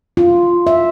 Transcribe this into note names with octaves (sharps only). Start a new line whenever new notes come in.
F4
E5